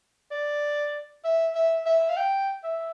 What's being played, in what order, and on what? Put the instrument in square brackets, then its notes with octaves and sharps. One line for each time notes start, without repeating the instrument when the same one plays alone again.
[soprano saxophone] D5
E5
E5
E5
F5
G5
E5